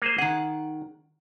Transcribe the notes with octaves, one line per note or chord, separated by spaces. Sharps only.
A#3 G#4 C5
D#3 G#4 F#5